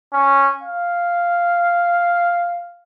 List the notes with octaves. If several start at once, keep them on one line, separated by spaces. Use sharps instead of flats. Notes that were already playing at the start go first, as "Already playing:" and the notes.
C#4
F5